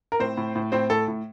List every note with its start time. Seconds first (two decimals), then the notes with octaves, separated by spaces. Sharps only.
0.12 A#4
0.20 A2 C4 C5
0.37 A2
0.56 A2
0.72 A2 C4 C5
0.90 A2 A4
1.08 A2